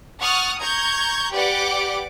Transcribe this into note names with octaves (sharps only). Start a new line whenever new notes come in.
F#5 C#6 D#6 F6 A6
A#5 C#6 G6 G#6
G4 B4 D5 F#5 G5 D6